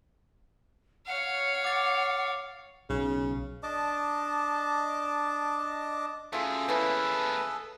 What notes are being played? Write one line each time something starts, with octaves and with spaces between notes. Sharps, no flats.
C#5 F5 F#5
D6 A6
B1 C#3
D4 D#5 A5 D6
F#2 A3 F4 G#4 A4
C#3 E3 A#3 B3 B4 A5